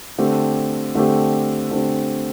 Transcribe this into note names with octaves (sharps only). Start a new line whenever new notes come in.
D3 A3 C4 G4
D3 A3 C4 G4
D3 A3 C4 G4